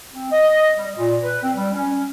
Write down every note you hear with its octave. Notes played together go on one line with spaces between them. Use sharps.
C4
D#5
G3
A#2
B4
C4
G3
C#4